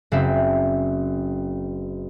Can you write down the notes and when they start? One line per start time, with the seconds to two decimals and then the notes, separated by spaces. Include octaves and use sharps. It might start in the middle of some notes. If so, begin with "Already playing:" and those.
0.12 F#1 C4 C5 E5